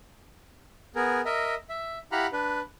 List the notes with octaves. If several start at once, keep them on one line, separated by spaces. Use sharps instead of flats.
B3 G#4 A#4
A#4 D#5 E5
E5
E4 G4 F5 F#5 A#5 B5
D4 B4